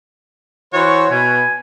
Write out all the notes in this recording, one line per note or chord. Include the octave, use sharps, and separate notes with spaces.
E3 F#4 C5 C#5
B2 G#5